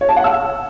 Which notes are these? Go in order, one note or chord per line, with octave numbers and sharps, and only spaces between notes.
C#5
A5
F#5
E6